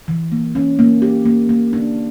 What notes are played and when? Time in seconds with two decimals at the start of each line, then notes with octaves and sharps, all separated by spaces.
0.08 E3
0.32 A#3
0.55 C#4
0.79 A#3
1.02 G4
1.25 A#3
1.49 A#3
1.73 D4